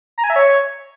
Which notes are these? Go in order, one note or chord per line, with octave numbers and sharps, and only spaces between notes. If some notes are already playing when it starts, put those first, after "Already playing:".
A#5
G#5
E5
C#5